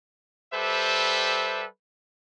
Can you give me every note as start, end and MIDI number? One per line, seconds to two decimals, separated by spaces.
0.54 1.65 55
0.54 1.65 67
0.54 1.65 69
0.54 1.65 71
0.54 1.65 72
0.54 1.65 76